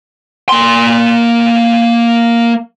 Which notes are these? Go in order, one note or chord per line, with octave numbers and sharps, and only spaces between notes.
A#3 C6